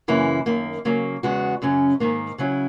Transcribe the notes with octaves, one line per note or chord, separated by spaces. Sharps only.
F#2 C#3 E3 A#3 E4
F#2 D#3 A#3
C#3 F#3 A#3
E2 C#3 G#3 B3 F#4
F#2 C#3 F#3 C#4
G#2 D#3 A#3
C#3 F#3 C#4 E4